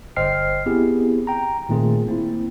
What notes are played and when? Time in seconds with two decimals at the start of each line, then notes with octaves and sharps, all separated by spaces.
0.16 G1 C5 D#5 G5 F6 C7
0.66 B3 C4 E4 G4 G#4
1.27 G5 A#5
1.69 A#2 D#3 A3 C4 F4 G#4
2.07 A#3 C4 E4